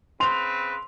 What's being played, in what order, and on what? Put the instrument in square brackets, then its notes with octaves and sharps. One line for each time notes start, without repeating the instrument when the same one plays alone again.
[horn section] C#3 C4 B4 [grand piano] C6 F7